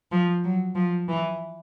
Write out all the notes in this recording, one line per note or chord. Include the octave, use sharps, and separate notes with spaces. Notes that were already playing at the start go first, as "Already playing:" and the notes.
F3
F#3
F3
E3